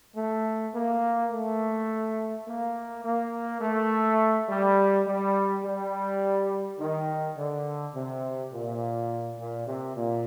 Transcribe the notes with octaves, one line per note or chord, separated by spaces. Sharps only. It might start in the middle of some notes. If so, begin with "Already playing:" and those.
A3
A#3
A3
A#3
A#3
A3
G3
G3
G3
D#3
D3
C3
A#2
A#2
C3
A#2